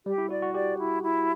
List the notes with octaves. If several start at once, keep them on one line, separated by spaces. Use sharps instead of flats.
G3 G4
E4
F#4 D5
F#4
G4 D5
E4
E4